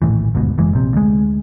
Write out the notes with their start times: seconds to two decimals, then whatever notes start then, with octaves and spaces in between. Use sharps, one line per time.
0.02 A#1 D#2 A2 E3
0.35 G1 D2 G#2 B2
0.58 F#1 E3 G#3
0.73 A#1 C3
0.93 D2 G#3